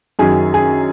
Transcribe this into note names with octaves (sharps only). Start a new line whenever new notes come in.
F#2 D#3 F#3 C#4 G#4
G#4